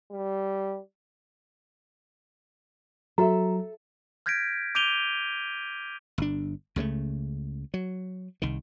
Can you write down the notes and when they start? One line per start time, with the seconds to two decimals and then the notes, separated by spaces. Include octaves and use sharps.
0.11 G3
3.18 F#3 F#4 A4 E5 A#5
4.26 F6 G6 G#6 A#6 B6 D7
4.75 D6 G6 D7 D#7 F7 G7
6.18 G1 D4
6.76 C#2 C#3 F#3 A3
7.74 F#3
8.42 C2 D#3